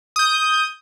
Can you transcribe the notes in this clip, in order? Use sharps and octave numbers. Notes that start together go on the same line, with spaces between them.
D#6 G6